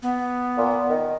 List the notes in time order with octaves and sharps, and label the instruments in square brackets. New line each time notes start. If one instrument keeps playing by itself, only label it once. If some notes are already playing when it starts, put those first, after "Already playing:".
[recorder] B3
[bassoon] A#2
D#3